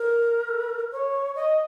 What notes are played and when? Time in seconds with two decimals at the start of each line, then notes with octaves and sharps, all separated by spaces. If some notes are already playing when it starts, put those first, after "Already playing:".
Already playing: A#4
0.92 C#5
1.35 D#5